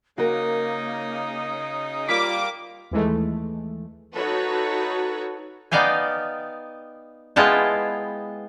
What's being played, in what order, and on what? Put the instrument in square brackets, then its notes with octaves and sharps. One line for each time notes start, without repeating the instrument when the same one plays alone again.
[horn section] C#3 D#4 [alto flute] A#3 [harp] F#4 A#4
[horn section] G3 A#3 [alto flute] F4 [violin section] D6 [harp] B6
[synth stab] D#2 E3 G#3 A3
[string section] D#4 F#4 A4 B4 C#5
[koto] B3 D#4 D5 F5 G5 G#5
G#3 B3 E4 F4 G5 A5